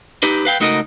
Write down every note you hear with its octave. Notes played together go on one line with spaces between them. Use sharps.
D#4 G4 B4
B4 F5 G5
C#2 A3 D#4 F#4 A#4 D#5